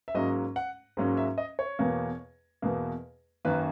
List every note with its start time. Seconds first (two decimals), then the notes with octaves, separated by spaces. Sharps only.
0.08 E5
0.15 G#2 F#3 A#3 C#4 D#5
0.56 F#5
0.97 G#2 F#3 A#3 C#4
1.17 E5
1.38 D#5
1.59 C#5
1.79 E2 B2 A#3
2.62 E2 B2 A#3
3.45 F#2 D#3 A#3 C#4 B4